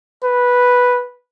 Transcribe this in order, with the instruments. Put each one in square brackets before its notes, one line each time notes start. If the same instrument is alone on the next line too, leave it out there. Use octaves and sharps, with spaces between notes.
[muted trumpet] B4